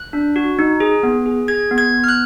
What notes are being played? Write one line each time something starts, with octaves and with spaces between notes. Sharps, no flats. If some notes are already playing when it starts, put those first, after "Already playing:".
Already playing: F#6
D4
F#4
D#4
G#4
B3
G#4
G#4 G#6
B3
G#6
B3
F6
F#6